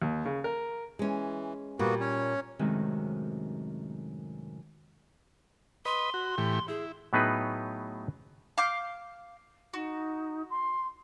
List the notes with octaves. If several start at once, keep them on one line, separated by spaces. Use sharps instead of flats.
D#2
C#3
A#4
E3 G#3 C#4
A#2 G3 A#3 B3 F#4
C#4 C#5
F#2 A2 C3 D#3 G#3
B4 D#5 C6
F#4
A2 E3 G4
E4 G#4
A2 F#3 B3 D#4 G#4 B4
F5 D6 G6
D#4 F#4
C6